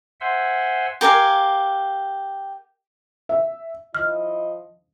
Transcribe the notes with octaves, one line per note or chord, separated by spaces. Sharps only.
C5 E5 F#5 G#5 C6 E6
G4 A#4 F5 G#5
E5
F3 E4 D#5 F6